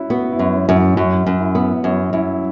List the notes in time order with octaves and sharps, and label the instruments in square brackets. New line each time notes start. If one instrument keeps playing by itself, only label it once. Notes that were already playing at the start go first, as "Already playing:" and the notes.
Already playing: [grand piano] C#4 E4 F#4
[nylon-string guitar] B3 [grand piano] F#4
[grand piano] E4
[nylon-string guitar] F#2
[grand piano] C#4
[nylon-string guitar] F#2
[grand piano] E4
[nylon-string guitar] F#2 [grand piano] F#4
[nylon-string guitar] F#2
[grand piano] E4
[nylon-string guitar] B3
[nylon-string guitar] F#2 [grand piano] C#4
[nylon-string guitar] F#2 [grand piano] E4